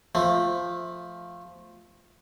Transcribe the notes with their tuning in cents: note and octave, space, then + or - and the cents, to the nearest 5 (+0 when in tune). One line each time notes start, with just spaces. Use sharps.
F3 +0 A3 -5